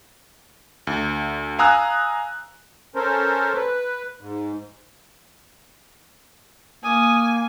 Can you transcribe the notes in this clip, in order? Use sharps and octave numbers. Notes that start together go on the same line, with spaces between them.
D2
F5 G#5 A#5 D#6 E6 F#6
C#4 A4 A#4 C5
B4
G#2
A#3 G#5 D#6